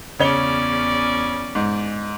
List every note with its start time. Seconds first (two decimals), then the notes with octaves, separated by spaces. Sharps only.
0.19 E2 C#3 C#4 C#5 D5 G7
1.55 G#2